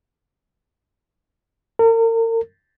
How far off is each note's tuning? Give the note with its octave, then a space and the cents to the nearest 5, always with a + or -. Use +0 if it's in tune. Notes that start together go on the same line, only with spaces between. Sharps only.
A#4 -40